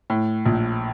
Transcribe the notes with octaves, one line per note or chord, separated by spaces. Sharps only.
A2
A#1